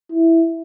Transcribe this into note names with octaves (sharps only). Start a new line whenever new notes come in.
E4